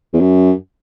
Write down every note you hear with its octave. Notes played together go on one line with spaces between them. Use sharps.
E2
F#2